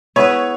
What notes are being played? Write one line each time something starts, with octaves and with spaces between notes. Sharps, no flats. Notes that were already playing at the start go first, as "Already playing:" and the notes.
B3 E4 G#4 B4 C#5